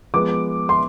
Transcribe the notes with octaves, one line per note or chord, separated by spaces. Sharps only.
F3 G#3 B3 D6
C6